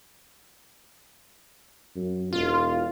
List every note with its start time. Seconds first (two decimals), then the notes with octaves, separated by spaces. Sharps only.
1.96 F#2
2.33 E1 F4